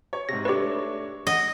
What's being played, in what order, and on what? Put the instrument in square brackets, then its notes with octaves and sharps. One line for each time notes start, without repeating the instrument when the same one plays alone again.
[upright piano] C#5
[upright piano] G#2 C3 [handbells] A#6
[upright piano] A3 D4 C#5 [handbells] G4 B4
[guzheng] D#5 [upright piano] F#5